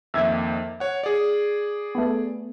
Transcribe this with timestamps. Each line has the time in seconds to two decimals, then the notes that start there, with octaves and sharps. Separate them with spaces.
0.14 F2 D#3 A#3 E5 G#6
0.80 C#5 F#5
1.03 G#4 D5
1.95 A3 B3